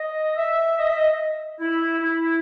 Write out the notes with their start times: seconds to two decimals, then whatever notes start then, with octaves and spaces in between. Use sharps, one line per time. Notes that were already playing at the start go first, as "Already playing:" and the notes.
Already playing: D#5
0.36 E5
0.78 D#5
0.88 E5
0.97 D#5
1.59 E4
1.99 E4